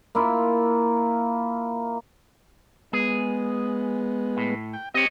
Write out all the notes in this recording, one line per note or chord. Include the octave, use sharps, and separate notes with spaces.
A#3 E4 F4
G#3 B3 G#4
A2
G5
C4 G4 C#5 D#5